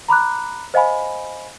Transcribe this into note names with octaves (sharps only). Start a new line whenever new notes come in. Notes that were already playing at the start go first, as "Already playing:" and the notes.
A#5 B5 D6 F#6
C5 D#5 F5 G#5 B5